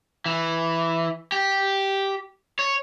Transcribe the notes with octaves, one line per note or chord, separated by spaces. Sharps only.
E3
G4
C#5